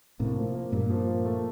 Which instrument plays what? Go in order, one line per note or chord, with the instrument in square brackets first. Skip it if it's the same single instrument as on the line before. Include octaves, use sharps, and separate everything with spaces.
[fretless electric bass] A2 C3 [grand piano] A#3
[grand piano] F3
A#3
[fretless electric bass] G2 A#2 [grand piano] A#3
[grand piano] F3
A#3
A3